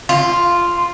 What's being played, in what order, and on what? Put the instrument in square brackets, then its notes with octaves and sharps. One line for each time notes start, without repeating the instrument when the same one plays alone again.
[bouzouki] F4